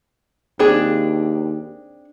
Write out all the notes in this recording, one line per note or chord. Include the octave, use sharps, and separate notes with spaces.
D#2 C4 D4 G#4